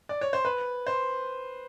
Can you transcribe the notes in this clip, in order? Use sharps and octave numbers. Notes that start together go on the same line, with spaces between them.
D5
C#5
C5
B4
C5